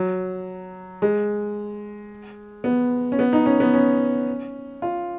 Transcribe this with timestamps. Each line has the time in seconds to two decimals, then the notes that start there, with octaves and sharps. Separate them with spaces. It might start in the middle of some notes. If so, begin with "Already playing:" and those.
Already playing: F#3
1.02 G#3
2.64 B3
3.12 C#4
3.19 B3
3.33 D#4
3.46 C#4
3.60 B3
3.74 C#4
4.82 F4